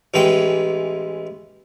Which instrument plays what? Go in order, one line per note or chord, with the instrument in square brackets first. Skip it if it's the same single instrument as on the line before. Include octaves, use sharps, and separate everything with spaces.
[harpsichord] A1 E3 G#3 G5